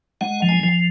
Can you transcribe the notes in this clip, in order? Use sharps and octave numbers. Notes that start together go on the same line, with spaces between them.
G#3 F#5
F3
G#5
F3